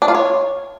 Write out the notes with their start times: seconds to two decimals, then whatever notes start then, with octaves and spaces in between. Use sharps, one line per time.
0.02 D4
0.08 F4
0.15 C#5